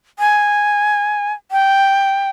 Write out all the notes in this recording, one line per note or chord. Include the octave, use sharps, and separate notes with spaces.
G#5
G5